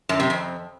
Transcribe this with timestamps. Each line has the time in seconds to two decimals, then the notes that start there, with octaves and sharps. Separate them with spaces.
0.09 F#2
0.20 C3
0.30 F2